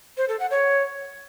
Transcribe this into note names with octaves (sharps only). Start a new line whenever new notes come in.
C5
A4
F#5
C#5